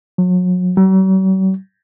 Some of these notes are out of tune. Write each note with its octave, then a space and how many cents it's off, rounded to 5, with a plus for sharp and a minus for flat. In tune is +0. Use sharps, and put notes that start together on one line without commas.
F#3 -35
F#3 +45